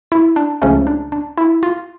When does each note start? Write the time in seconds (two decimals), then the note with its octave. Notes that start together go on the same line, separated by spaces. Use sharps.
0.12 E4
0.36 D4
0.62 C#2 C#3 F3 A3 C#4
0.87 D4
1.12 D4
1.38 E4
1.63 F4